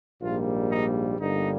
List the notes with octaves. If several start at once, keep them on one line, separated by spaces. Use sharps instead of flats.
A#1 G#2 G3 A#3 F4
D#4
G1 G2 D3 G3 A#3 D#4